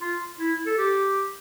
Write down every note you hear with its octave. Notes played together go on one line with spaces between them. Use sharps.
F4
E4
A4
G4